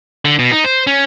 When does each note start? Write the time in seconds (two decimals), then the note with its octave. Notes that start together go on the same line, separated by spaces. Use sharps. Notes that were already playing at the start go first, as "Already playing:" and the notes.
0.25 D3
0.39 B2
0.52 D#4
0.64 C5
0.87 C#4